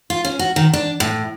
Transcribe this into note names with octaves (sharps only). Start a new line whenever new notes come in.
F4
C#4
F#4
D#3
D4
A2